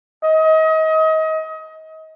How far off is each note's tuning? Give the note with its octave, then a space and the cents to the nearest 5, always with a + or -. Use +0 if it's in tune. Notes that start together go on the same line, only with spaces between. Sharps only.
D#5 +30